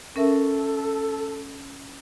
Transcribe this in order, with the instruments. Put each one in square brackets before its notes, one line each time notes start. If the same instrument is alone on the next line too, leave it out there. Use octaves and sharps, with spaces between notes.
[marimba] C#4 A#4 E5 [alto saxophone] A4